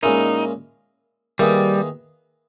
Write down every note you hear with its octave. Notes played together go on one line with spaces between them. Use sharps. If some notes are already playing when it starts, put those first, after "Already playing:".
A#2 G#3 C#4 D#4 E4 A#4
D#3 G3 A#3 E4 G#4 B4